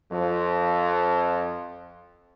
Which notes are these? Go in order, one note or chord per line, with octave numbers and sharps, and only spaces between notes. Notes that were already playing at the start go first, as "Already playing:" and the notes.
F2 F3